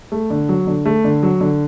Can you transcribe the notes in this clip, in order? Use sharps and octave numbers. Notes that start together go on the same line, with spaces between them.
A3
D3
F#3
D3
A3
D3
F#3
D3